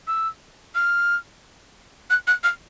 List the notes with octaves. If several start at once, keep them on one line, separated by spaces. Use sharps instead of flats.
E6
F6
F#6
F#6
F6